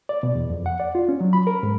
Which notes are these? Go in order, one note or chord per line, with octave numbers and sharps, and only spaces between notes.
D5
B2
E2
F2
F#5
D5
F4
C#4
F#3
B5
A#4
G#2